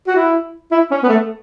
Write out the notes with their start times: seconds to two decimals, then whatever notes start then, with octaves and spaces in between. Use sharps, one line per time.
0.07 F#4
0.16 E4
0.72 E4
0.91 C#4
1.03 B3
1.09 A3